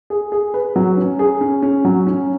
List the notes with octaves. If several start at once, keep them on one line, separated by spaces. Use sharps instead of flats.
G#4
G#4
B4
F#3
C#4
G#4
C#4
C#4
F#3
C#4